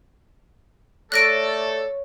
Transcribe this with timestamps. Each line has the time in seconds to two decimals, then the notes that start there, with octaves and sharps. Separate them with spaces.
1.12 A3 A4 C#5 D5 F#6 A#6 D7